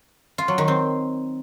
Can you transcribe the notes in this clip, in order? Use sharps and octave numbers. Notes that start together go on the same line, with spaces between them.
F4
F#3
D#3
C4